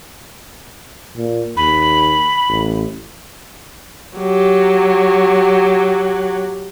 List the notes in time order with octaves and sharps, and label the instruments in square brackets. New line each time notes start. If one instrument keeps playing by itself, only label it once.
[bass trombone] A#2
[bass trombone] D#2 [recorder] B5
[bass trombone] A1
[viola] F#3 G4